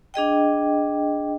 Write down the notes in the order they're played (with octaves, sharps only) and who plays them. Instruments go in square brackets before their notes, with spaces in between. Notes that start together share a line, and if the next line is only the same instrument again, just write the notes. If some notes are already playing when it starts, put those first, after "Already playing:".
[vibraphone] D4 G#4 D#5 G5